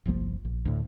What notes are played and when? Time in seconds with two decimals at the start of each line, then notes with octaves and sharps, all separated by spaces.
0.06 G1 C2 F3 A#3
0.45 A#1
0.65 D2 A2